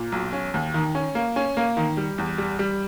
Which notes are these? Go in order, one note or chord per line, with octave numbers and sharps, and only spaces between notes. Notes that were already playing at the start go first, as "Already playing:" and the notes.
Already playing: A#2
B1
C#4
D#2
D#3
C#4
A#3
C#4
A#3
D#3
G3
E2
G3
G3